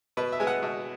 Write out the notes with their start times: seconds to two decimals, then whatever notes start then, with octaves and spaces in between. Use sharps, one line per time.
0.17 B2 B4
0.32 E5
0.40 G#3 B3 G#5
0.47 F#5
0.63 B2